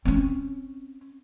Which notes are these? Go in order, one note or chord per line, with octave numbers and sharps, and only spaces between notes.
C4 C#4